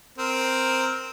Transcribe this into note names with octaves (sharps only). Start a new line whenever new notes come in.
C4 A#4